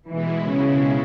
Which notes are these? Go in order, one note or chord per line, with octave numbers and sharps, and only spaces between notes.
B2 E3 G#3 E4
C#3